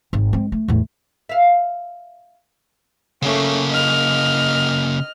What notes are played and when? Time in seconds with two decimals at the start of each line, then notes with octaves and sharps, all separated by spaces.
0.13 G#1
0.33 G#3 C4
0.52 A3
0.68 E2 A2
1.29 E5 F5
3.22 C#3 A3 A#3 C#4
3.70 D#5 F6